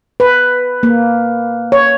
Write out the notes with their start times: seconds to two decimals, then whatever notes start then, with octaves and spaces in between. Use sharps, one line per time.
0.20 B4
0.83 A#3
1.72 C#5